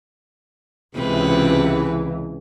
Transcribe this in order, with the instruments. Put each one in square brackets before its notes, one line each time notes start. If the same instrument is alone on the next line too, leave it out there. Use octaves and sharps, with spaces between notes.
[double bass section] C#2 E3 [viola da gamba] C3 B4